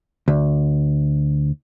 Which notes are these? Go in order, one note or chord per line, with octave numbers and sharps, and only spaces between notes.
D2